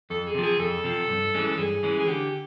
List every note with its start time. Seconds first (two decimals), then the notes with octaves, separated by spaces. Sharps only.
0.10 F2 A4
0.27 G#4
0.35 C3 F3
0.43 G#4
0.59 F2 A4
0.84 C3 F3
1.09 G2
1.35 E3 G#3 C#4
1.58 G2 G#4
1.83 E3 G#3 C#4
1.99 G#4
2.08 D3 G4